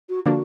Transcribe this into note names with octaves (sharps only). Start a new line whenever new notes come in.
F#4
D3 F3 A#3 D4 F#4